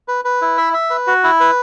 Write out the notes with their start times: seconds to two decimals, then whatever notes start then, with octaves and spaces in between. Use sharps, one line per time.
0.08 B4
0.25 B4
0.42 E4
0.57 E5
0.73 E5
0.90 B4
1.07 F#4
1.24 E4
1.40 B4